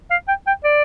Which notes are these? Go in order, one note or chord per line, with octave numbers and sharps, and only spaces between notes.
F5
G5
G5
D5